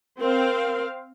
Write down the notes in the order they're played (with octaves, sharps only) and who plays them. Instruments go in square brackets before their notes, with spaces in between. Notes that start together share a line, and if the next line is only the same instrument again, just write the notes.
[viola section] C4 F5 [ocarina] A#4